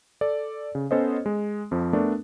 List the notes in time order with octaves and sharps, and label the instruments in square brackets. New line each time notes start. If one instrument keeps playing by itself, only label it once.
[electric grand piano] A4 D5
C#3
B3 C#4 A4 C5 C#5 D#5
G#3
F2 F3
A3 B3 D4 A#4 D5